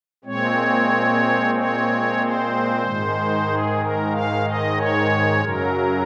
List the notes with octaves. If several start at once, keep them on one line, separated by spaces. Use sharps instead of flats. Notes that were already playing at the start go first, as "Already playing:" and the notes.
A#2 G#3 C4 C#5
C#5
C5
G#2 D#3 G#3
G#4
A#4
F5
D#5
C#5
F#2 C#3 F#3 A#4